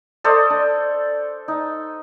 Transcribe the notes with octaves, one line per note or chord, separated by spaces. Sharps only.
A4 C5 D5 D#5
D4
D#4